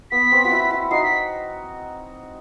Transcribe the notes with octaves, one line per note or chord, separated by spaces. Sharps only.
B3 B6
C4
F#4
E4
E4
D#4 F#4 C7
B6